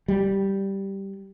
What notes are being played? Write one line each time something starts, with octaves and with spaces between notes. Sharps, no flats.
G3